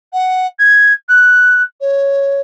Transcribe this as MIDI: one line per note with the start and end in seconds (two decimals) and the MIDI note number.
0.13 0.46 78
0.59 0.93 92
1.08 1.62 90
1.80 2.41 73